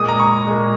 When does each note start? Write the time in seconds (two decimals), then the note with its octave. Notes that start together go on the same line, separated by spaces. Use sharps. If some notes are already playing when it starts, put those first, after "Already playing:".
Already playing: A#2 G#3 D#6
0.08 A#5
0.20 C#6
0.47 A#2 G#3